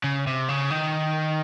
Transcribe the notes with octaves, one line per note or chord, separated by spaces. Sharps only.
C#3
C3
C#3
D#3